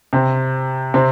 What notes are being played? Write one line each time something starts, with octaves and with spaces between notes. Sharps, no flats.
C3 C4
C3 C4